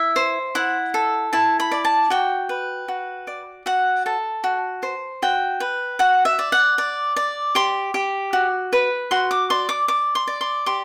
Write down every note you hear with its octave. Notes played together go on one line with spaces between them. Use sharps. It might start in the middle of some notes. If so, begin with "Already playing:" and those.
Already playing: E4 E5
C5
E4 F#5
A4
E4 A5
B5
D5
A5
F#4 G5
B4
F#4
D5
F#4 F#5
A4 A5
F#4
C5
F#4 G5
B4
F#4 F#5
E5
D5
F#5
D5
D5
G4 C6
G4
F#4
B4
F#4 C6
D6
D5 C6
D6
D5 D6
C6
D5
C6
G4 C6